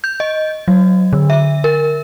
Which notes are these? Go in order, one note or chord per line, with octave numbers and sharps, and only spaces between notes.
G6
D#5
F#3
D3
E5
A#4